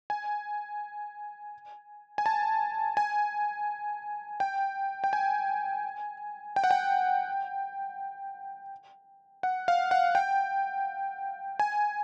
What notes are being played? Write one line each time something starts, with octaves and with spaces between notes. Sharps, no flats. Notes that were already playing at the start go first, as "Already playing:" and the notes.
G#5
G#5
A5
G#5
G5
G5
G#5
G5
F#5
G5
F#5
F5
F#5
G5
G#5